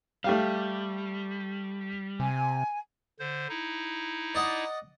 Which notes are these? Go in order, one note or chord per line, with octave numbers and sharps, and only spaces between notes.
G3 A3 G4 F5
C3 G#5
D3 C5
D#4 E4
D5 D#5 F#5